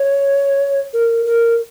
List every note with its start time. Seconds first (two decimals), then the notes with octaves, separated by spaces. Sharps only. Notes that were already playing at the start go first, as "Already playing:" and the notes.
Already playing: C#5
0.93 A#4
1.26 A#4